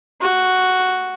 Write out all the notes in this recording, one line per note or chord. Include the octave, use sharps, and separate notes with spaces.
F#4